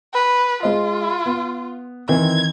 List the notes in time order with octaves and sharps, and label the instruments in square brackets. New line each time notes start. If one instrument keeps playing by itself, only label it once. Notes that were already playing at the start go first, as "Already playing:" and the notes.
[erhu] B4
[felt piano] G#3 C5 D#5 [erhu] F4
[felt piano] B3
[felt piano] D#3 E3 C4 [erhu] G#6